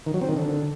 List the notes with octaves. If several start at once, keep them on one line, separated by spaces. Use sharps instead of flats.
D#3
F#3
C4
D#3
D3